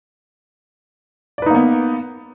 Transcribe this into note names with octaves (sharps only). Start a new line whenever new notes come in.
A#3 B3 D#4 B4 D5